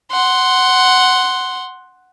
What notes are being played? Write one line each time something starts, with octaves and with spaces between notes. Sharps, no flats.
F#5 C6